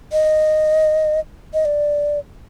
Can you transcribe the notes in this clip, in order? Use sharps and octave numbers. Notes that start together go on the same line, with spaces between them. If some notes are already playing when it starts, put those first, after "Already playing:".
D#5
D#5
D5